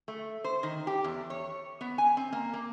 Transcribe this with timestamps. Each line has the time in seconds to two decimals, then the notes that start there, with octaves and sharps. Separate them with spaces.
0.08 A3
0.44 C5
0.63 D#3
0.87 G4
1.04 E2
1.30 C#5
1.81 B3
1.98 G#5
2.17 C4
2.33 A#3
2.53 A#3